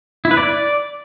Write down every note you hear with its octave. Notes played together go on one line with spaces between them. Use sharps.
E4
B4
D5